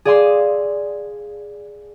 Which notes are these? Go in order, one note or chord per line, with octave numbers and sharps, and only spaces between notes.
G#4 D5 F5 G#5 C6 E6